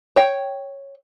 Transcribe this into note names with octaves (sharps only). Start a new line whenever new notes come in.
C#5 G5